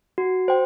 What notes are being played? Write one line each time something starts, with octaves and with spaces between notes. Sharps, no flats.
F#4
C5 G5